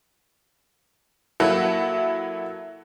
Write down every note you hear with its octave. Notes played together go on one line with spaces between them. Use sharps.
F#3 A#3 E4 A4 F#5